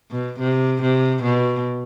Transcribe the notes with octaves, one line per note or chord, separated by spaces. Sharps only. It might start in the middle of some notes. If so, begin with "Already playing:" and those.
B2
C3
C3
B2